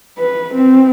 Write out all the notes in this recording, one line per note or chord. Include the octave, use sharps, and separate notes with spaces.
B4
C4